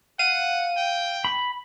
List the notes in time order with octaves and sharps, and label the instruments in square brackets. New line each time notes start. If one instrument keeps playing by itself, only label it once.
[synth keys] F5 D#7 [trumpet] F#5
[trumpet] G5
[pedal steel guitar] B5